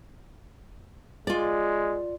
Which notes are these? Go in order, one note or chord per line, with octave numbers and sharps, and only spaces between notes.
G#3 F4 D5